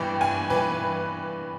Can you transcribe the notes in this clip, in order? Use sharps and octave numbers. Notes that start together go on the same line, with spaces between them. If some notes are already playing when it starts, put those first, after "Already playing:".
Already playing: G2 E3 G5
G2 G#5
E3 B4